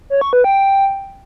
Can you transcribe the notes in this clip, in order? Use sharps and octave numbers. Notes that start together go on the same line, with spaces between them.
C#5
C#6
B4
G5